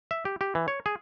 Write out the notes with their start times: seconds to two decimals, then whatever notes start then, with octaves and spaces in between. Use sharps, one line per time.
0.11 E5
0.25 G4
0.41 G4
0.55 E3
0.68 C#5
0.86 G#4